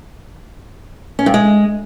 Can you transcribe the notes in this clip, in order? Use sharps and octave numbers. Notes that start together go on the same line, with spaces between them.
C#4
G2
G#3